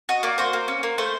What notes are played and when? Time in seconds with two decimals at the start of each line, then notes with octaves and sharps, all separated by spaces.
0.09 F#4 D#5
0.23 A#3 D5
0.38 F#4 C5
0.53 A#3
0.68 C#4
0.83 A#3
0.98 A3 C5